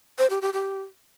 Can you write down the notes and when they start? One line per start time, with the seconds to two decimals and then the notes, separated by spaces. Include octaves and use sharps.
0.18 C5
0.30 G4
0.42 G4
0.53 G4